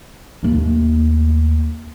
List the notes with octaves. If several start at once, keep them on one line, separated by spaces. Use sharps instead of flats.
D#2 A3